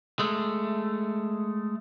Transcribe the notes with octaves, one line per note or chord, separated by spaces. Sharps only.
G#3 A3